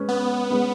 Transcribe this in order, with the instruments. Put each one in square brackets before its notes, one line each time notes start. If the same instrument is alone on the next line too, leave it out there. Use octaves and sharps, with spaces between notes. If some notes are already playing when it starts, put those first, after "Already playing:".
Already playing: [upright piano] G#3 C#4 B4
[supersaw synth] B3
[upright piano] G#3 C#4 B4